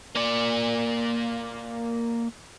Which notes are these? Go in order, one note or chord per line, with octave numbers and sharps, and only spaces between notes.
A#3 D5